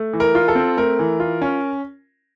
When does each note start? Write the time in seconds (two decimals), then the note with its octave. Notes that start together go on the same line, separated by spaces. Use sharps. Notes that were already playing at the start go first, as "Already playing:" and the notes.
Already playing: A3
0.13 E3
0.20 A#4
0.35 F4
0.48 A4
0.55 C4
0.77 A3 A#4
0.99 E3
1.20 F4
1.42 C#4